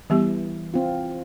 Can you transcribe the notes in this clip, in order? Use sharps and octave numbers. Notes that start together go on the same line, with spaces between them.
E3 G3 B3 G4
C4 F4